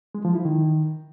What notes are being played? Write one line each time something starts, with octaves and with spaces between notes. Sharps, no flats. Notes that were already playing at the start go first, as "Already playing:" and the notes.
G#3
F3
E4
D#3